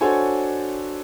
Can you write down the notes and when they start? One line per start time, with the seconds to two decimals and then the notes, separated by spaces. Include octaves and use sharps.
0.01 D4 F#4 A4 C5 C#5 G#5